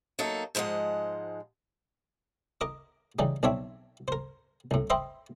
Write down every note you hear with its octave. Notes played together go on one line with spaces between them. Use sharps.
F#3 A#3 D#4 A4
G#2 F3 G#3 D#5 F#5
A#4 D#5 D6
C#3 E3 G3 D#4
B1 C4 D4 C#5 E5
A#4 C5
C2 A2
B4 C5 D#5 E5 G5 C6